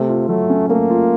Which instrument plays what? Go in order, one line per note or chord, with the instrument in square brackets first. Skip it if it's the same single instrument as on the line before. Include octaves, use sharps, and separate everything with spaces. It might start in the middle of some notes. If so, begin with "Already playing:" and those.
Already playing: [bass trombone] C3 [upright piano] A3
[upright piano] F4
[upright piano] F#3 [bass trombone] A3
[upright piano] C#4
[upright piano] A3 [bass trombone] A#3
[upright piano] F4